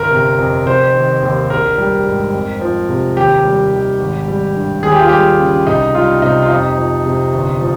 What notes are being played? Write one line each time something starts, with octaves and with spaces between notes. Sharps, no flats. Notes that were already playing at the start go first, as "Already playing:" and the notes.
Already playing: G1 A#4
C3
F2
F1 C5
D#3
D#2
A#1 A#4
G3
G#2
F2
F3
C3
D#2 G4
G3
D#3
G#1
G3
G2
D#2 G#4
G4
F4
G3 G4
C#3
C2 D#4
G3 F4
C3 D#4
F4
F2 D#4
F3
C3
G1
F3